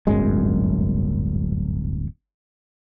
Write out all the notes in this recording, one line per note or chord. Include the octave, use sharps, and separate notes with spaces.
D1 G1 F#2 G#3